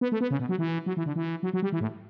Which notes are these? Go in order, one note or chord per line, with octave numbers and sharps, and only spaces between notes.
B3
A3
B3
C#3
B2
F#3
E3
F#3
E3
D3
E3
F#3
F#3
G3
E3
A2